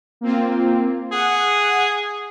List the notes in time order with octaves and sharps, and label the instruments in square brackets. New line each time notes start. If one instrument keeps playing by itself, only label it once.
[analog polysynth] A#3 C4 F4
[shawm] G#4 [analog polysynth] F#5